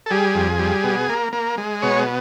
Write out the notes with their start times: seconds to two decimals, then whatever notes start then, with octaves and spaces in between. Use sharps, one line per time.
0.06 A4
0.11 G3 G#4
0.35 F2
0.59 G3
0.84 B2
1.09 A#3
1.33 A#3
1.58 G#3
1.82 B2 C#5